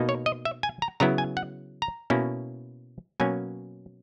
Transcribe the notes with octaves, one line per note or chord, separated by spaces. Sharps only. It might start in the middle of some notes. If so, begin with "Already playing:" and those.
Already playing: B2 A#3 D#4
C#5
D#5
E5
G#5
A#5
C#3 F#3 B3 E4 A#5
G#5
F#5
A#5
B2 A#3 C#4 E4
B2 F#3 A#3 C#4 G#5